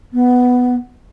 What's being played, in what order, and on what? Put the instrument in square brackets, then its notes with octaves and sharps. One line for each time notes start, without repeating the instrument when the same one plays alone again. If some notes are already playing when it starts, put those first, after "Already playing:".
[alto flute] B3